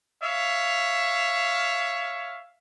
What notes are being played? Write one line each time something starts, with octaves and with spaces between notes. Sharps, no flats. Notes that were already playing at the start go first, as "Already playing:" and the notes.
C#5 E5 F5